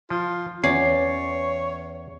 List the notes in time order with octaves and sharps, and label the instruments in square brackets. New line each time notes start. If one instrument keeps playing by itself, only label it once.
[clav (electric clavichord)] F3 [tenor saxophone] F4
[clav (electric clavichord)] E2 [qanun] C#4 D5 [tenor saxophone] C#5 [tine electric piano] C7